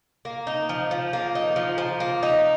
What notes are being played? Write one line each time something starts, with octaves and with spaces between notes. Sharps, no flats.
A#3
D#4
F3
F3
A#3
D#4
F3
F3
A#3
D#4